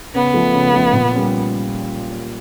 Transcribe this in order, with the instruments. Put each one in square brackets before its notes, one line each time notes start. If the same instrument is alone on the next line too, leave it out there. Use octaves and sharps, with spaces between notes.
[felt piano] C#3 [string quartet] B3
[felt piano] F3 A3
C#3
F3 A3
A#2
G3 A#3 C#4 F4